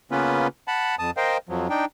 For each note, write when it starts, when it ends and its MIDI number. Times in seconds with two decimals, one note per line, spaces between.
0.11 0.47 49
0.11 0.47 58
0.11 0.47 59
0.11 0.47 61
0.11 0.47 65
0.11 0.47 71
0.68 0.95 78
0.68 0.95 81
0.68 0.95 83
0.99 1.11 41
0.99 1.11 81
0.99 1.11 87
1.17 1.37 70
1.17 1.37 72
1.17 1.37 75
1.17 1.37 77
1.17 1.37 79
1.49 1.68 41
1.49 1.68 53
1.49 1.68 54
1.70 1.85 62
1.70 1.85 63
1.70 1.85 79